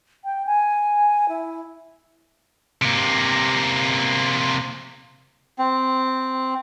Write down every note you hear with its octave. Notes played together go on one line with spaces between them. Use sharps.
G5
G#5
E4
C3 A#3
C4